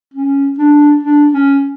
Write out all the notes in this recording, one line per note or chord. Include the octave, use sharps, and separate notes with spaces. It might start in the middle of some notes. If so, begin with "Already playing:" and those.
C#4
D4
D4
C#4